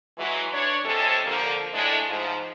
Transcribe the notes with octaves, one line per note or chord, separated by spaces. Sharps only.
E3 F#3 G#3
D4 C#5
C3 F3 G#3 C#4 A4
D3 F3 A#3
A2 G#3 D4
G#2 F3